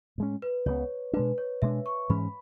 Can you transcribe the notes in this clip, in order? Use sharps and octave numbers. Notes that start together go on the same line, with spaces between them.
A2 G#3 C#4
B4
C#2 C#3 F#3 B3 C#5
B2 G#3 D4 B4
C#5
B2 G#3 B3 D4 E5
C#6
G#2 E3 G#3 C#4 B5